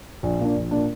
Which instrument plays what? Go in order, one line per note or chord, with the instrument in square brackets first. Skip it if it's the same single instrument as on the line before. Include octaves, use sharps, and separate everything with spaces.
[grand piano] A#1
A#2 A#3 D4
A#1
A#2 A#3 D4